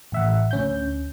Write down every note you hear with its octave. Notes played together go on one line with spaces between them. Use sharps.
A1 E5 F#5
D2 C#4 G6